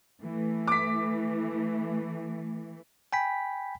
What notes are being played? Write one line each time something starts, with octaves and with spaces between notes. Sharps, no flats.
E3 A3
D6 B6
G5 G#5 B5 B6